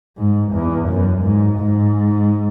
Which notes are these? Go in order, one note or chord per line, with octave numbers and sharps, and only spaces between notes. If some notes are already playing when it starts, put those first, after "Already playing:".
G#2
E2
F#2
G#2
G#2